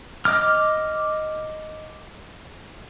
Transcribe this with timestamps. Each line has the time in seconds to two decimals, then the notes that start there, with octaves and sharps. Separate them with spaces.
0.25 D#5 D6 F6